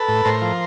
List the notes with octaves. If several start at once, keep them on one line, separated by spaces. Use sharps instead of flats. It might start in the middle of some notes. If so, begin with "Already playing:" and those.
Already playing: A4 B4
A2
A2 A#4 C5
F3